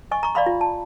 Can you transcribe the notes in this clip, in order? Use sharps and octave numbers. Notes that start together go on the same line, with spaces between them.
D#5 G#5 C#6
A#5 C#6
D5 D#5 F5 B5 C6
F4
A5